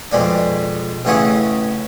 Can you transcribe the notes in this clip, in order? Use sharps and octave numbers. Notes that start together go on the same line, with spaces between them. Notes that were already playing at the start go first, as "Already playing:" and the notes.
F2 B2 G#3 D4
A1 C#3 E3 C#5 F#5 D#6